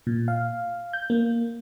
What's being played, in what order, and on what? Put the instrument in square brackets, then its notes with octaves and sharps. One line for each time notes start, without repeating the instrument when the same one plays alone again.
[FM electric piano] A#2
F5
G6
A#3